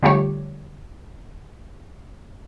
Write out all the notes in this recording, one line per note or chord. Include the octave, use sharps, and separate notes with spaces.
D3 F3 G3 A3 G4 C#5